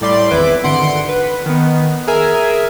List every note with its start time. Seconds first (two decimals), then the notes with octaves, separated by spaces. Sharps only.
0.01 A2 G3 D5 C6
0.30 G#1 E2 E4 B4 D6
0.64 G#1 D3 F#5 C6 C7 D7
1.08 B4
1.46 D#3 B3
2.07 G#4 A#4 E5 G#5